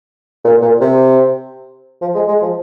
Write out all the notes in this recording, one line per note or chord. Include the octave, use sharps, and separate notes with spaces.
A#2
A#2
C3
F3
G#3
G#3
F3